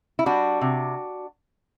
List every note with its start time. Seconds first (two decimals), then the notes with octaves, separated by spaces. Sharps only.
0.19 E4
0.26 G3 D4 F#4
0.61 C3